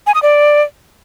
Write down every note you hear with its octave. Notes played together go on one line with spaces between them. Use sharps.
G#5
D#6
D5